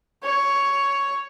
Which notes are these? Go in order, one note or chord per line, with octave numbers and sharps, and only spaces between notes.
C#5